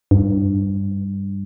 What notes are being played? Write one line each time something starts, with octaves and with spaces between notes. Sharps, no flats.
G2